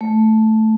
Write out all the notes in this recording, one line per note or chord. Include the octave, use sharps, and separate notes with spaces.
A3